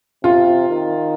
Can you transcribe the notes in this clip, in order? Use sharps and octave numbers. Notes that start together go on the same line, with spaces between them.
C3 F4
D#3